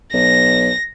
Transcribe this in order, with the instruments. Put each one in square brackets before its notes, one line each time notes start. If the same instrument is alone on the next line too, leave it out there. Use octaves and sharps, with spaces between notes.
[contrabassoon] B1 [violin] A#6